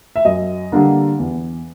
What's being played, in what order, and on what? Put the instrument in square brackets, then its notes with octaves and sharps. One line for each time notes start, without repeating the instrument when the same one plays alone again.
[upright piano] E5
F#2 D#5
D3 G3 A#3 D4
E2